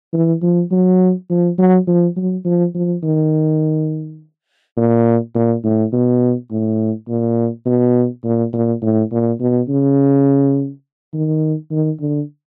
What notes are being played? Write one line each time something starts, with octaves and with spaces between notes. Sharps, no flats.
E3
F3
F#3
F3
F#3
F3
F#3
F3
F3
D#3
A#2
A#2
A2
B2
A2
A#2
B2
A#2
A#2
A2
A#2
B2
C#3
D#3
D#3
D3